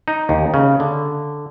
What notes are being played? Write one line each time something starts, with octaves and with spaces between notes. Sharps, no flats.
D#4
D#2
C#3
D3